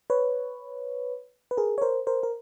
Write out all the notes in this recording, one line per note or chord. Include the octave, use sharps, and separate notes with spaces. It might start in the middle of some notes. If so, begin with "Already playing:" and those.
B4 C#5
B4
G#4 A#4
C#5
A#4 C5
A#4 C5
A#4